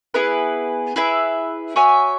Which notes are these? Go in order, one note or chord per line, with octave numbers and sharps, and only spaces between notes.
B3 E4 G#4 B4
E4 G#4 B4 E5
F#4 C#5 E5 G#5